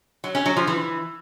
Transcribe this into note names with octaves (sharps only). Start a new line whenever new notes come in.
F#3
C#4
F#3
F3
E3